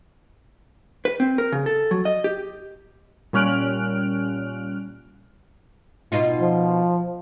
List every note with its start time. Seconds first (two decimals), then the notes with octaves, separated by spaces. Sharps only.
1.05 B4
1.20 C4
1.38 A#4
1.52 C#3
1.66 A4
1.91 F#3
2.05 D#5
2.24 G4
3.33 A#2 G3 C#4 F6 F#6 D7
6.12 B2 D#4 F4
6.41 F3